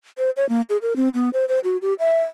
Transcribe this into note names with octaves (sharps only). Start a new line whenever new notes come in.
C5
C#5
A#3
G#4
A#4
C4
B3
C5
C5
F#4
G4
E5